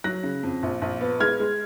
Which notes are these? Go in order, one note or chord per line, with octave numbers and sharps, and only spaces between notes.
F#3 F#6 A#6
C#3
F2
A#1
A#1
B3
G#3 F6 G#6
G#3